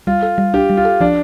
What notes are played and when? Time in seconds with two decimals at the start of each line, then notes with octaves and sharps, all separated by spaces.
0.07 G3 F4
0.23 A4
0.38 G3
0.54 D4 G4
0.70 G3
0.77 F4
0.85 A4
1.01 F3 D4